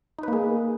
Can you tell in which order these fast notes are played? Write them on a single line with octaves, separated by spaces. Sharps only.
D#4 B4 A#3 G#4